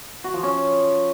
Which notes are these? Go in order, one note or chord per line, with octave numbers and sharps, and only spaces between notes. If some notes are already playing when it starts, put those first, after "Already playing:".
F#4
F3
C#4